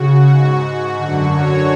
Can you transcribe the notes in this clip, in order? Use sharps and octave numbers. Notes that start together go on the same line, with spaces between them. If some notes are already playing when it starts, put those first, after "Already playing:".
Already playing: C#3 F#4
G#2 F#4
F#2 D3
C#5